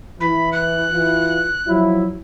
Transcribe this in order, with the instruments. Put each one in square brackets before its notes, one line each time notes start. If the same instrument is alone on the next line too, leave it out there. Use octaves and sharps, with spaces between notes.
[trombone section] E3 E4 [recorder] B5
[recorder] F#6
[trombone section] E3 F4
F3 F#3 E4